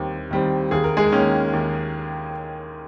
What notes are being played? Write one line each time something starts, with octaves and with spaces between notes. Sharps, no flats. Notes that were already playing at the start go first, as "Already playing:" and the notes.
Already playing: D#2 D#3 G3 C4
D#3 G3 C4
D#2 G#4
A#4
G#3 G#4
D#3 A#3 C#4
D#2